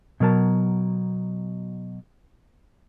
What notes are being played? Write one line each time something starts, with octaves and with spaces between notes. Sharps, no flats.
B2 F#3 A#4 A5